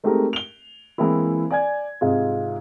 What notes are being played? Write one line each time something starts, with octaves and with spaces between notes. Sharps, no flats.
G#3 A3 C4 D#4 G4 A#4
F7 G7
E3 G#3 A#3 C4 E4
D5 G#5 G#6
G#2 C3 G#3 F4